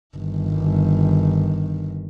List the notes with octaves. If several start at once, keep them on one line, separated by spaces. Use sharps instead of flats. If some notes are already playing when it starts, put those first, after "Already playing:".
G1 D#3